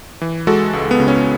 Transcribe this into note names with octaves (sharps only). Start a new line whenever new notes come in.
E3
G#3 F#4 A4
C#2
B3
C#3
C#4